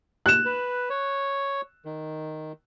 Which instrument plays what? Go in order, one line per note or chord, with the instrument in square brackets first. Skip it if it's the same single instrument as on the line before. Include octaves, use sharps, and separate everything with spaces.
[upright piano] F#6 E7
[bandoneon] B4
C#5
D#3